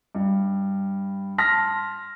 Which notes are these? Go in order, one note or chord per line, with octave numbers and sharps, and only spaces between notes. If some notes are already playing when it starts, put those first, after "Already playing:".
G2
A5 C6 F6 A#6 B6